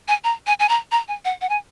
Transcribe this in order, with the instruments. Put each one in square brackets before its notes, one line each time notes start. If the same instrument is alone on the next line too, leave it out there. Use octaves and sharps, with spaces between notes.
[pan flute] G#5
A#5
G#5
G#5
A#5
A#5
G#5
F#5
F#5
G#5